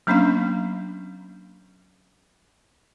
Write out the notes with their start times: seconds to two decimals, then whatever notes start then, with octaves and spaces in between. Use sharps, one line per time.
0.07 F#3 A#3 B3 C#4 D4 F5